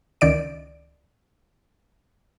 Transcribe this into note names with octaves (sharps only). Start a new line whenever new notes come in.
C#2 D#3 D5 D7